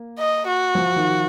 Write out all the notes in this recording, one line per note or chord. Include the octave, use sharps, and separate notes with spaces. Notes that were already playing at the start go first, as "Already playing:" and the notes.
Already playing: A#3
D#5
F#4
F3
D#3